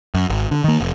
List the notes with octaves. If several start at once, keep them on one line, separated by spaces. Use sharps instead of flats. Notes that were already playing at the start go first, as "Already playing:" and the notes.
F#2
G#1
D3
D#3 A#3
F1